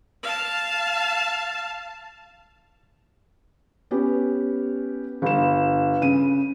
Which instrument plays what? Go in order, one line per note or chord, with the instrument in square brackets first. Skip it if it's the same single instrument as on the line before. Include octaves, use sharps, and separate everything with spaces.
[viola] F5 A5
[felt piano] B3 C#4 G4
G1 E7
C#3 D#7